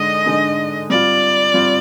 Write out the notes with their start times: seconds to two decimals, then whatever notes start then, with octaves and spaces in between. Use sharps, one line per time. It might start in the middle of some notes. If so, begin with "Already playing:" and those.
Already playing: D3 G#3 D#4 D#5
0.26 D3 G#3 D#4
0.90 G3 C4 F4 D5
1.54 G3 C4 F4